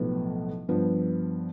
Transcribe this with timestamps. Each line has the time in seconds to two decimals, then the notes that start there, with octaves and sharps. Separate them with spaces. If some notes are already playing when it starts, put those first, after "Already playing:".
Already playing: B1 A2 F3 B3
0.68 G2 F3 B3